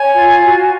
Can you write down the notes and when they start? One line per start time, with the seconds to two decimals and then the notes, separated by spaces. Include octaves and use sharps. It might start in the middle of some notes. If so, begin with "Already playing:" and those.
Already playing: C#5 G#5
0.15 F4
0.44 F#4